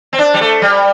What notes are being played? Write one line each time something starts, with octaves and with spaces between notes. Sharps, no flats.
C4
D4
G3
A3
G3